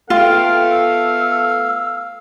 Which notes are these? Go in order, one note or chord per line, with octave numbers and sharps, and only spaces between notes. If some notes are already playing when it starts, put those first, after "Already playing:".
A3 B3 F4 A4 F5 G5
E6